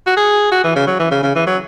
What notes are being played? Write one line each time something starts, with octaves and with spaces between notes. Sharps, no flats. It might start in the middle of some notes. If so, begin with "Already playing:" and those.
F#4
G#4
F#4
E3
C#3
F#3
E3
C#3
C#3
E3
F#3